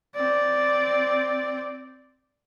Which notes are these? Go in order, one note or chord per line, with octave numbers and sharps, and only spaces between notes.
C4 D5